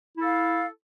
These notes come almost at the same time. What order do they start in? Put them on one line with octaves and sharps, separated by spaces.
E4 A4 F5